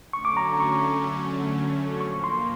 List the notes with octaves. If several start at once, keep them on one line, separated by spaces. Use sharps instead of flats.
D3 F#3 A3 C#4 C#6
D6
A#5
C#6
A#2 F3 A#3 C#6
C6